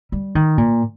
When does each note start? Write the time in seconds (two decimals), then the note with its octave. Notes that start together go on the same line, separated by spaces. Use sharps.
0.12 G3
0.35 D#3
0.58 A#2